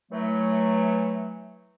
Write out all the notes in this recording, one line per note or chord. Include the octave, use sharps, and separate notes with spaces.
E3 F#3 A3